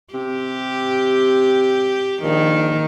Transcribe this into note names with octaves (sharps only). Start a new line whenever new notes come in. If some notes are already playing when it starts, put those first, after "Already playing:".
C3 G4
A#1 D#3